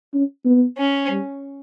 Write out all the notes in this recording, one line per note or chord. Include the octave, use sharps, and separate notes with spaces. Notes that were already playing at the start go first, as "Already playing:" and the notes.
C#4
B3
C#4
G3